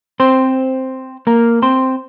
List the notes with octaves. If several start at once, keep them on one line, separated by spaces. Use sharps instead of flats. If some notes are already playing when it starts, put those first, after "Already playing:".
C4 C5
A#3 A#4
C4 C5